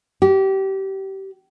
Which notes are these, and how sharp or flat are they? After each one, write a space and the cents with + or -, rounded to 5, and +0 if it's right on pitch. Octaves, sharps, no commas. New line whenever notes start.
G4 -25